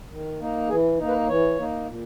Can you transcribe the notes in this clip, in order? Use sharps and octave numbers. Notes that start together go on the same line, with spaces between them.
D#3
A#3 D#4
E3 G#4
A#3 D#4
B4
E3 C#5
A#3 D#4
A#2